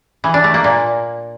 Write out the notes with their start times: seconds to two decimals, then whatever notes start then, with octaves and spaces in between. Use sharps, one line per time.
0.24 E3
0.34 D4
0.44 A3
0.54 A#3
0.64 A#2